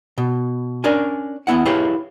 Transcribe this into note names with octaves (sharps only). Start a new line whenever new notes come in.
B2
C#4 D4 A#4 D5 G#5
D#2 B3 E4 F#5
E4 G4 G#4 B4 C#5 F5